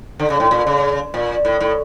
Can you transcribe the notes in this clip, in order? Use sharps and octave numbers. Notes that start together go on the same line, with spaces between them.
D3
C#3
A2
A#2
C#3
A#2
A2
A2